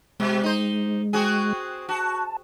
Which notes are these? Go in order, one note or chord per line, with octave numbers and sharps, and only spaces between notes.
B2 G#3
D#4 C5
C4 F#4 G#4
F#4 A5